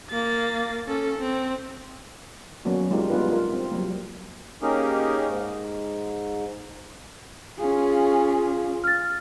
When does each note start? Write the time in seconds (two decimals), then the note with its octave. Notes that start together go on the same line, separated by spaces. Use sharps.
0.10 A#3 A6
0.87 C#4 A4
1.19 C4
2.65 F#3 A#3 B3 C#4 F#4
2.91 G#3 A#3 D4 D#4 F4 G4
3.10 G3 B3 D4 D#4 F4 B4
3.29 F4 A#4
3.53 C4
3.72 F#3 G3 A#3
4.62 A#3 C#4 D#4 G4 G#4 A#4
5.27 G#2
7.59 C#4 F4 G#4
8.84 F6 A6